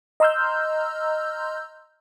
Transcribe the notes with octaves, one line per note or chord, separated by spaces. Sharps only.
D#5 A#5 C6 E6 F6 G6